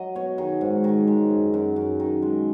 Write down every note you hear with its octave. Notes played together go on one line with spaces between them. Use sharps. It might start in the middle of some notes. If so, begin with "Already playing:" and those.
Already playing: F#3 D#5
B2 C#5
D#3 G#4
G#2
D#3
G#3
F#2
F#2
F#2
D#3
G#3